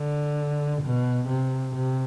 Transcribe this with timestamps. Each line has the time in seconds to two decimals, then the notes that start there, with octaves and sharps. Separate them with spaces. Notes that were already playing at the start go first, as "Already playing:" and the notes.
Already playing: D3
0.82 B2
1.28 C3
1.74 C3